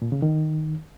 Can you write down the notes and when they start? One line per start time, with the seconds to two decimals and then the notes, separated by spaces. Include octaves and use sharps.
0.02 A#2
0.12 C#3
0.22 D#3